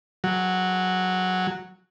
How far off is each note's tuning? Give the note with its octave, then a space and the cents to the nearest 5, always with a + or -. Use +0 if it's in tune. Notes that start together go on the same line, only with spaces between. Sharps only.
F#3 +0